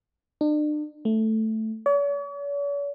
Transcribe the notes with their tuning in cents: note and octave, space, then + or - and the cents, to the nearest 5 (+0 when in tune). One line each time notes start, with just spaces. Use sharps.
D4 +40
A3 +0
C#5 +45